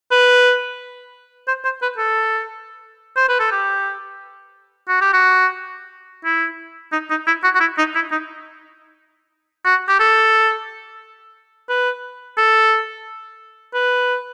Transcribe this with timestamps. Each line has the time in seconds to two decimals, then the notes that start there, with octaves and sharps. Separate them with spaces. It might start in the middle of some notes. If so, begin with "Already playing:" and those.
0.11 B4
1.47 C5
1.64 C5
1.82 B4
1.98 A4
3.16 C5
3.28 B4
3.39 A4
3.51 G4
4.88 F#4
5.01 G4
5.13 F#4
6.25 E4
6.92 D#4
7.10 D#4
7.26 E4
7.43 F#4
7.55 F#4
7.60 E4
7.78 D#4
7.95 E4
8.11 D#4
9.65 F#4
9.88 G4
10.00 A4
11.69 B4
12.37 A4
13.74 B4